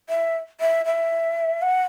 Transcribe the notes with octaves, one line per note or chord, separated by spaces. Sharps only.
E5
E5
E5
F#5